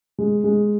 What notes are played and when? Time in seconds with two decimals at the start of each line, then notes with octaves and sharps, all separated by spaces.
0.18 G#3
0.44 G#3